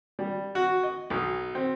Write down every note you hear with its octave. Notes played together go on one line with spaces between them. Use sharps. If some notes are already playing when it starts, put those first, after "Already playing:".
G3
F#4
D#5
B1
C4